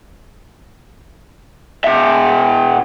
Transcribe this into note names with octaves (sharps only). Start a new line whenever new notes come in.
B2 E5